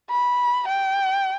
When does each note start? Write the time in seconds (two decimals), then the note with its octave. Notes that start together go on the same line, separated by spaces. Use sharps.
0.10 B5
0.68 G5